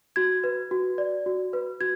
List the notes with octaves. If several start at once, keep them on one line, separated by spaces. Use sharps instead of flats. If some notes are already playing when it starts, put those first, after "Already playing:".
F#4 G#6
B4
F#4
D5
F#4
B4
F#4 G#6